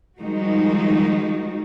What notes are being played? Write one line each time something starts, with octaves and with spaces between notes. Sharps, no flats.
D#3 F3 G3 G#3 D#4 F#4